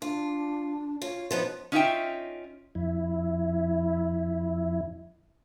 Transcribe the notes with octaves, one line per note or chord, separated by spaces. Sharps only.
D4 F4
F4 C#5
F3 B3 D#4
C#4 D#4 F4 F#4 E5 G5
F2 E4